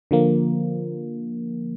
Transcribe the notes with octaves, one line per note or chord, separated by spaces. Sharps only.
D3 F3 A#3